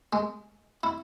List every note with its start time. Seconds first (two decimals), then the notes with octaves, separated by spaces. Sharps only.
0.13 G#3
0.83 E4